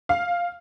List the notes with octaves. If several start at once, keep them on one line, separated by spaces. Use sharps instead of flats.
F5